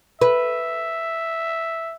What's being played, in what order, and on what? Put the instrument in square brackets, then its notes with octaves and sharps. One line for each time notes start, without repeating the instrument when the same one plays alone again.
[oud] B4 [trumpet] E5